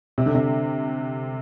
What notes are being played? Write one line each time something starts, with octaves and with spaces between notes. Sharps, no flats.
C3
D3
C3